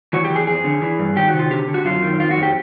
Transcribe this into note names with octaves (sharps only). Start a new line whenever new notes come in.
E3 F#4
G4
E3
G#4
F2 G#4
D3
E3
G2
D#3 G4
F#4
C3
F4
D3 G4
D3
F#4
F#2 F4
D#3
F2 F4
F#4
F2
G4